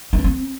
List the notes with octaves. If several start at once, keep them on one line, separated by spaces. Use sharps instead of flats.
D#4
D4
C4